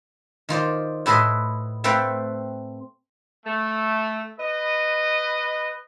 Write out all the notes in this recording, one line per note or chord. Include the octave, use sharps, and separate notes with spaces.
D#3 F4 C5 D5
A2 E4 A4 B4 D#5 C6
A3 C4 A4 B4 F5 G5
A3
B4 D#5